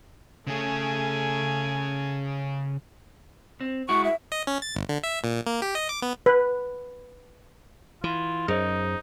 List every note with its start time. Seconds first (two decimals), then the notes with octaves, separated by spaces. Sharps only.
0.47 C#3 A3 G#4 G#5
3.61 C4
3.89 G#3 E4 F#4 C#6
4.04 E5
4.32 D#5
4.47 C#4
4.62 A6
4.75 G1
4.89 D3
5.03 E5
5.24 A#2
5.47 A#3
5.62 G4
5.75 D#5
5.89 D6
6.02 B3
6.26 B4
8.04 E3 F4
8.48 F#2 D#4 G#4 C5 D#5